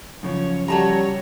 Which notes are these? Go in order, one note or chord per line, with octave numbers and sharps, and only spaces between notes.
F#2 C#3 F3 C#5
F#3 G3 C#5 A5 A#5